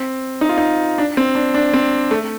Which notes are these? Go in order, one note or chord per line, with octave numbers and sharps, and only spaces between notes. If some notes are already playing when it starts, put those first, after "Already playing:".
Already playing: C4
D#4
F4
D#4
D4
C4
D4
D4
C4
A3